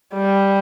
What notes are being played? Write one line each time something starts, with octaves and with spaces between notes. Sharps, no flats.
G3